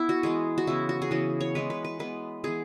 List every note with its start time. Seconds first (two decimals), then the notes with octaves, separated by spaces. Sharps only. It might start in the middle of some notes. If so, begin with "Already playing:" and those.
Already playing: B3 E4
0.09 F#4
0.23 E3 G#3 B3 G#4
0.58 F#4
0.67 C#3 E3 B3 E4
0.89 F#4
1.02 G#4
1.11 C#3 E3 B3 F#4
1.40 C#5
1.55 E3 G#3 B3 B4
1.70 B4
1.84 B4
1.99 E3 G#3 B3 B4
2.44 E3 B3 G#4